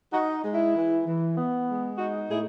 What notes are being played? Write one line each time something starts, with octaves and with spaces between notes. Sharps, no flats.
D#4 F#4
G#3
E4
E3
E3
B3
G#3
D#4 F#4
A2 E4 G#4